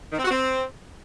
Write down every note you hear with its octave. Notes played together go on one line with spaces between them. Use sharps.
D#3
C4
F#4
C4